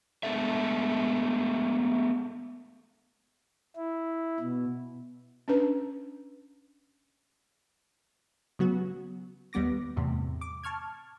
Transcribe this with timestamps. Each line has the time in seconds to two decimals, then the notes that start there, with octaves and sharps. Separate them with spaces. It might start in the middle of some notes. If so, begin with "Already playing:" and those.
0.23 G#3 A3 B3 D4 A4 E5
3.76 E4
4.40 B2
5.48 C#4 D4 B4
8.59 C#3 F#3 B3 F#4
9.53 D#2 G3 B3 D6 A#6
9.97 E2 A2 C3
10.41 D6
10.64 A5 C#6 F6 G#6